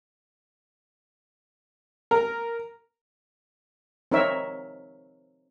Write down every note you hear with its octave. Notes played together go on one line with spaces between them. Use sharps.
A#4
C4 D#4 A#4 C#5 E5